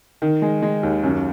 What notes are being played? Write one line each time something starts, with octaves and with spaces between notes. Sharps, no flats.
D#3
G#3
G#3
D#2
F#2